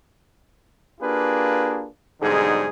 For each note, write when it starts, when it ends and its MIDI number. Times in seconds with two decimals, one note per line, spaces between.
1.01 1.87 58
1.01 1.87 62
1.01 1.87 65
1.01 1.87 67
1.01 1.87 68
1.01 1.87 71
2.22 2.69 35
2.22 2.69 44
2.22 2.69 50
2.22 2.69 55
2.22 2.69 63
2.22 2.69 68